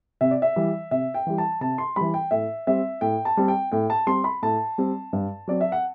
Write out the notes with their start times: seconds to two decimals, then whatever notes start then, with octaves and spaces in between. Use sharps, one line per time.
0.21 C3 E5
0.31 D5
0.42 E5
0.56 E3 G3
0.91 C3 E5
1.14 G5
1.27 E3 G3
1.38 A5
1.61 C3 A5
1.78 C6
1.96 E3 G3 B5
2.14 G5
2.31 A2 E5
2.67 G3 C4 E5
3.01 A2 G5
3.25 A5
3.37 G3 C4
3.48 G5
3.72 A2 G5
3.90 A5
4.07 G3 C4 C6
4.24 B5
4.42 A2 A5
4.78 G3 C4
5.13 G2
5.47 F#3 C4 D5
5.61 E5
5.72 F#5